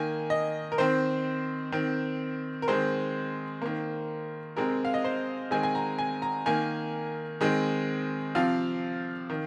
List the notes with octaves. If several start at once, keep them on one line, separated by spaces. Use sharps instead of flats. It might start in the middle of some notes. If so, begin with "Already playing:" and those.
Already playing: D#3 A#3 G#5
D#5
A#4
D#3 C4 C5
D#3 C4
A#4
D#3 G#3 C4 C5
D#3 A#3
C3 G#3 C4 A#4
F5
D#5
C5
D#3 G#3 C4 G#5
G#5
A#5
G#5
A#5
D#3 A#3 G#5
D#3 G#3 C4
C3 F3 C4 F5
D#3